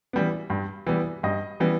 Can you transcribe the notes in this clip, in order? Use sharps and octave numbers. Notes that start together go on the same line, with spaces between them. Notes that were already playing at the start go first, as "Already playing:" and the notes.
E3 G3 B3
G2
E3 G3 B3
G2 D#5
E3 G3 B3